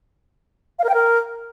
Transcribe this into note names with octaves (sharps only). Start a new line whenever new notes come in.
F5
A#4
G5
A#4